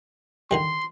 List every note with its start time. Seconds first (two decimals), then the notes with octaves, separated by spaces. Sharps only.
0.51 D3 D#3 G3 C6